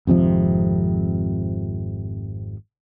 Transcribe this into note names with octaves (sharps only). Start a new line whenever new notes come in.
G#1 F2 C3 F3